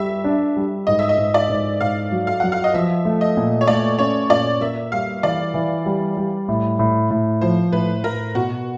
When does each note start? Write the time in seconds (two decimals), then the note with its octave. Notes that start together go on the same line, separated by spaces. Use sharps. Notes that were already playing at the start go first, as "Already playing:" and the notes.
Already playing: G3 E5
0.24 D4
0.57 G3
0.87 G#2 D#5
0.99 E5
1.09 D#5
1.18 G#2
1.34 D5
1.49 G#2
1.81 G#2 F5
2.12 F#3
2.27 F5
2.40 F#3 F#5
2.52 F5
2.64 D#5
2.74 F3 E5
3.05 A3
3.21 D#5
3.37 A#2
3.61 C#5
3.67 A3 D5
3.99 C#4 C#5
4.30 A#2 D5
4.61 A#3 E5
4.92 G3 F5
5.23 E3 D5
5.54 E3
5.86 G3
6.17 G3
6.49 A2
6.79 A2
7.11 A2
7.41 F3 C5
7.72 A2 B4
8.03 A2 A#4
8.35 B2 F#4